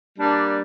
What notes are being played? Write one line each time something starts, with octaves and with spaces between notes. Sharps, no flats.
G3 A#3 D4